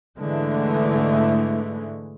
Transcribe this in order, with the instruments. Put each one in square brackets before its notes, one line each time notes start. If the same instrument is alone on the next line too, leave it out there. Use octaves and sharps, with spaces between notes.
[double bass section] G#2 D3 E3 G#3 A3